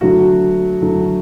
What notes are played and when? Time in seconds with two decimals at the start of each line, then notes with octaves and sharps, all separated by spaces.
0.01 D3 F#3 A3 F#4
0.82 D3 F#3 A3